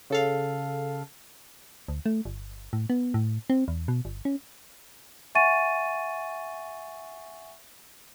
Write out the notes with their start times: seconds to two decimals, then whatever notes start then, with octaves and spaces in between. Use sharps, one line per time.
0.10 C#3 A4 F5
1.88 D2
2.06 A3
2.25 G1
2.73 A2
2.90 B3
3.14 A2
3.50 C4
3.68 E2
3.88 B2
4.05 G1
4.25 C#4
5.35 E5 F#5 G#5 C#6 A6 D#7